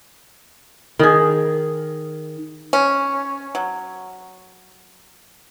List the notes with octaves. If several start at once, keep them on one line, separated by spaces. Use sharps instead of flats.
D#3 G#4
C#4
F#3